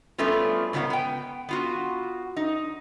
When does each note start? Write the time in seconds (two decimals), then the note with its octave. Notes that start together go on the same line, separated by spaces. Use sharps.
0.18 F#3 G3 A3 B3 C#4 F4
0.73 G#2 C#3 B3 F4 F#5
0.90 B3 G5
1.49 B3 F4 F#4
2.37 D#4